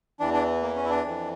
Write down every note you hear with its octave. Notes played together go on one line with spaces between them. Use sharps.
E2 E3 D4
D4
A#3
C#4
E4
D4
F2 E3